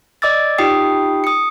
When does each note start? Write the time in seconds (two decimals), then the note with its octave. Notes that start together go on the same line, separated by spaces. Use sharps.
0.22 D5 D#5 D6 E6 A6
0.58 D#4 F4 G4 G5 D#6 C7
1.24 D#6 C#7